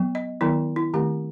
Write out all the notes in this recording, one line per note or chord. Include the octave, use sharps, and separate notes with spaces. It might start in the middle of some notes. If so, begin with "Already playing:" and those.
Already playing: F#3 B3
D#5
D#3 F#3 B3 E4
E4
D#3 A3 C4 G4